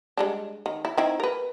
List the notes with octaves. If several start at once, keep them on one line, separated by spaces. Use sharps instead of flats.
G3 G#3 D4
D#3
E4
C4 D#4 E4
A#4 B4